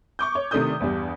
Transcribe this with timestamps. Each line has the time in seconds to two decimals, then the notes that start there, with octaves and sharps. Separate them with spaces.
0.19 C#6 D6 G6
0.35 C#5
0.51 C3 D#3 A3 D4 D#6 G6
0.80 E2 G2 G3